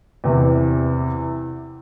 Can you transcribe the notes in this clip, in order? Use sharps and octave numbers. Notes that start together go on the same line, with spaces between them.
E2 C3 E3